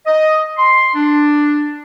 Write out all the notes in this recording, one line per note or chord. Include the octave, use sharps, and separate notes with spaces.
D#5
C6
D4